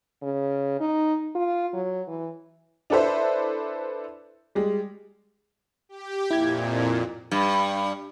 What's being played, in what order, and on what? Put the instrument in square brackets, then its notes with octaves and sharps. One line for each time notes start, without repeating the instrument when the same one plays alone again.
[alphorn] C#3
D#4
F4
F#3
E3
[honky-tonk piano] D4 E4 A4 B4 C5 E5
G3 G#3
[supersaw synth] G4
[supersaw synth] F2 A#2 [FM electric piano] E4 G#6
[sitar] G2